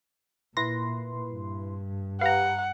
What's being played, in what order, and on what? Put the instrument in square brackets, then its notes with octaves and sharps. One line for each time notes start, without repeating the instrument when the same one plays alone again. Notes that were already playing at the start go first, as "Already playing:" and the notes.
[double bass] A#2 [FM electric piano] E4 B4 C6 [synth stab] A#6
[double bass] G2
[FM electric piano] G4 B4 [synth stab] F5 A#5 [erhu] F#5